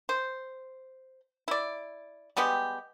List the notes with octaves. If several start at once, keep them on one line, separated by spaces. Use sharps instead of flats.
C5
E4 D5
G3 G#3 B3 G4